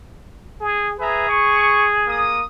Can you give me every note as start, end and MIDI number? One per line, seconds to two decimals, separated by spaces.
0.60 0.97 68
1.00 2.39 68
1.00 1.28 71
1.00 1.28 76
1.00 1.28 82
1.29 1.85 85
2.07 2.44 58
2.07 2.44 87